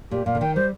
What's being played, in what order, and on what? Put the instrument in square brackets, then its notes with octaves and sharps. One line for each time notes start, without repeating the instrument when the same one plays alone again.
[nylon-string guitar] A#2 [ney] G4
[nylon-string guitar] A#2 [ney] F5
[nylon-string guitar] D3
[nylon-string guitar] D#3 [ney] G5
[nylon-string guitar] G3 [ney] C5